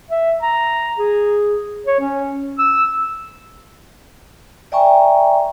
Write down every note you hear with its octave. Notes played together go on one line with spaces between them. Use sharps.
E5
A#5
G#4
C#5
C#4
E6
D5 E5 G5 G#5 A#5 C#6